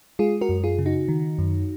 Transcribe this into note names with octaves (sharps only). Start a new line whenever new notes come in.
G#3 F4 G#4
F#4 A#4
F#2
F4 G#4
C#3
D#4 F#4
D#3
F#2